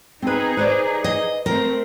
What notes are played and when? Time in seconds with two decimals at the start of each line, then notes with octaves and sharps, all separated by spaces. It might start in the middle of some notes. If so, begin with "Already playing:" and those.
0.22 C4 D#4 G#4 B4
0.57 B4 C5 D5
1.04 D#5
1.46 A3 C4 A#4